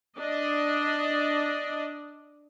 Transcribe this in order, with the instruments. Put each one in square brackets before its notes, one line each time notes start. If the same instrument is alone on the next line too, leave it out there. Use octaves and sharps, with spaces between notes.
[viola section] D4 D5 D#5